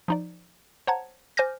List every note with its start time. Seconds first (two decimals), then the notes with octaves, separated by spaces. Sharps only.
0.08 F3 D#4 D5
0.87 C5 C#5 F#5 A5 A#5 G#6
1.37 C5 G#5 D6 F6 G6 A#6